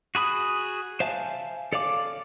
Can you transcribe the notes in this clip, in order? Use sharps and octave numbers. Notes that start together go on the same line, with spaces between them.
F#4 G#4 B5 D#6
C5 E5 F5 G#5 A5
A4 C#5 D5 F5 D6